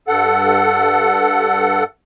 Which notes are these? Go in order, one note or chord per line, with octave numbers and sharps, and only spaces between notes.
G2 A4 F#5